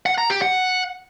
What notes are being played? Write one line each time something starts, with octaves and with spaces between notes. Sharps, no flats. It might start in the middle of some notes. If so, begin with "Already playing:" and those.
F#5
A#5
G4
F#5